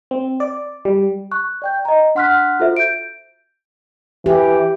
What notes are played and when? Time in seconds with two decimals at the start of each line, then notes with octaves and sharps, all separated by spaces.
0.11 C4
0.40 D5
0.85 G3
1.31 C#6 F#6
1.62 D5 G5 G6
1.85 D#5 A#5
2.15 D4 F#5 C6 F6 F#6 B6
2.60 F4 F#4 A4 C5 E5
2.76 G6 D7
4.26 E3 G4